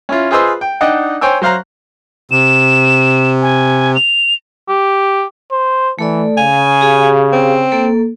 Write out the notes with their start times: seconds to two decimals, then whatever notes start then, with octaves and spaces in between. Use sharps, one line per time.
0.09 C#4 E4 F4
0.31 F4 G#4 B4 C5 D#5 E6
0.61 G5
0.81 D4 D#4 D#5 F#5 G5
1.21 C5 C#5 G5 G#5 E6
1.42 F#3 C5 F5 A#5 F#6
2.31 C3 E7
3.42 G#5
3.95 F7
4.69 G4
5.52 C5
5.99 E3 A3 A4 D5
6.37 C#3 F5 G#5
6.81 G4 G#4 F5
7.33 C4
7.72 A#3 A4